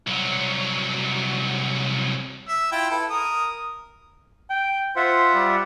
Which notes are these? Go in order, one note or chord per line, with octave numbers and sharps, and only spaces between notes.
C2 F#3
E5
E4 F4 G5
E4 A4 B4
A#4 D#6
G5
F4 C5 E5 F#5
G3